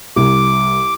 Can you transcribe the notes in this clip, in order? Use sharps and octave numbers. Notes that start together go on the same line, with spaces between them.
C2 D6